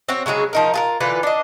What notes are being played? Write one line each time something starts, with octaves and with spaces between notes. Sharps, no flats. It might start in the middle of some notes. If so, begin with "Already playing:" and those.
C4 F#4 C#5
C#3 F#3 G#3 G#4
F3 D#4 A#4
F4 G#4 A#4
D3 E3 F4 B4
D4 D#5